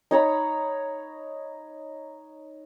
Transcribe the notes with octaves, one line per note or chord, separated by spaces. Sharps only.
D#4 C#5 A#5 B5